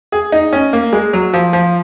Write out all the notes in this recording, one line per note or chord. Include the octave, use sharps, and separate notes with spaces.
G#4
D#4
C#4
A#3
G#3
F#3
F3
F3